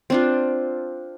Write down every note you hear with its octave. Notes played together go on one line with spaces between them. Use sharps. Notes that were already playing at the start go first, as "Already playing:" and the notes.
C4 D4 F4